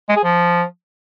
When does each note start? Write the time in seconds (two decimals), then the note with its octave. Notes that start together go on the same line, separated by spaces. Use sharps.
0.09 G#3
0.16 G#4
0.24 F3